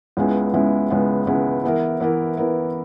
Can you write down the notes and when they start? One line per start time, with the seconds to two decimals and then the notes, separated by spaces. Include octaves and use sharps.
0.17 C#2 C#3 G#3 B3 E4
0.54 C#2 C#3 G#3 B3 E4
0.90 C#2 C#3 G#3 B3 E4
1.26 C#2 C#3 G#3 B3 E4
1.64 E3 B3 E4 A#4
2.00 E3 B3 E4 A#4
2.37 E3 B3 E4 A#4